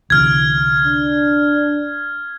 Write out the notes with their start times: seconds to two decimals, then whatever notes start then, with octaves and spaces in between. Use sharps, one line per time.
0.10 C2 D3 E3 F6 G#6
0.86 D4